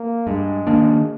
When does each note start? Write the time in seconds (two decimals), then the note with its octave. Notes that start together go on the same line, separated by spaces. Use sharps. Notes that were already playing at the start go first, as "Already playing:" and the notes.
Already playing: A#3
0.27 G2 G#3
0.67 D#3 A#3 D4